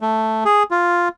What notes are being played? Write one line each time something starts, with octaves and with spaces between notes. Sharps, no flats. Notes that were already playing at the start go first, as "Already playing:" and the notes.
A3
G#4
F4